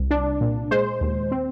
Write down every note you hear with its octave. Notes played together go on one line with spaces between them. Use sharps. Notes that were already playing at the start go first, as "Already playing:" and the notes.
Already playing: C2
D4
A#2
G#3 C5
D#2
C4